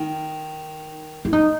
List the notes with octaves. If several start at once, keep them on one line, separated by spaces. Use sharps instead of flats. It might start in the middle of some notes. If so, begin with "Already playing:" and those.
Already playing: D#3 D#4
E4
D#4